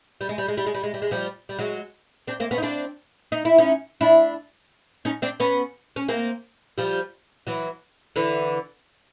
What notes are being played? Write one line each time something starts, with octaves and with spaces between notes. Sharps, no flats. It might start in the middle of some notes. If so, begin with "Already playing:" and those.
G3
G#3
G3
G#3
G3
G#3
G3
G#3
G3
G#3
F3 G3
G3
F#3 G#3
C4 D4
A#3 C4
B3 C#4
D#4
C4 D4
D#4
E4
C#4 D#4
D4 E4
C#4 D#4
C4 D4
B3 C#4
C#4
A#3 C4
F3 G3
E3 F#3
D3 E3